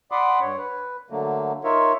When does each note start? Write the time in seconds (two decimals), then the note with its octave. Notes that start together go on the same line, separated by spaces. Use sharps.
0.12 D5 F#5 B5 C6 D6 D#6
0.41 G2 C#5
0.58 B4
1.10 D3 F#3 A3 A#3
1.64 D#4 F4 A#4 C#5 E5